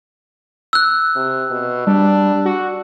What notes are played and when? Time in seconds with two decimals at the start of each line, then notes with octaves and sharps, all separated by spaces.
0.73 E6 F#6
1.15 C3
1.51 B2
1.87 G3 D4
2.45 F#4